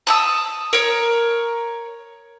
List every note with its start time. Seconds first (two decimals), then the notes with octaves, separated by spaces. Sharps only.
0.07 A5 D#6 E6
0.73 A#4 C#5